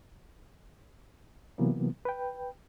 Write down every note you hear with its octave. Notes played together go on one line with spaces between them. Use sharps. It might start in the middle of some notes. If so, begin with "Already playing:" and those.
C3 E3 F#3 A#3 B3
B4 G5